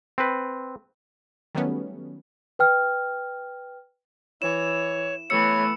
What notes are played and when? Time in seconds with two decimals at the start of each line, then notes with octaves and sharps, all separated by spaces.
0.18 C4 B4
1.55 D#3 F#3 G3 A3 B3 C#4
2.59 B4 G5 F6
4.42 E3 C#5 E7
5.30 E3 A3 B3 C#5 E6 C#7